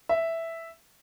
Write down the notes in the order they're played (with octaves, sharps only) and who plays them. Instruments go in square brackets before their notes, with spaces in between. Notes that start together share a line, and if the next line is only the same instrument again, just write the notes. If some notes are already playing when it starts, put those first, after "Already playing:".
[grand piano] E5